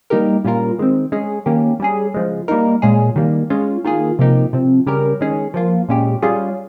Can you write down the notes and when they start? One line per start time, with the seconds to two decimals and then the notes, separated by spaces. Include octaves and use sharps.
0.10 G3 A#3 D#4 G4 A#4
0.44 A#2 G3 C#4 F4 A#4
0.78 D#3 G#3 C4
1.12 G#3 C#4 G#4
1.46 D#3 A#3 C#4 G4
1.80 G3 C#4 G#4
2.14 C#3 F3 G#3
2.48 G3 A#3 D#4 A#4
2.82 A#2 G#3 C#4 G#4
3.16 D#3 G3 A#3
3.50 G#3 C#4 F4
3.84 D#3 A#3 F4 G#4
4.19 C3 F3 A#3 D#4 G4
4.53 C3 F3 C4
4.86 C#3 G3 C#4 G4 A#4
5.21 D#3 G#3 C#4 G#4
5.54 F3 A#3 F4
5.89 A#2 G#3 C#4 G4
6.22 G3 C#4 F4 G#4